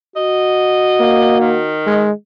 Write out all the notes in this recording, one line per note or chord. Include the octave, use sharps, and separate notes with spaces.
F#4 D#5
A#3
D#3
G#3